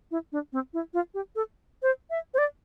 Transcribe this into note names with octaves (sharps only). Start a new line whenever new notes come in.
E4
D4
C4
E4
F4
G4
A4
C5
E5
C5
D5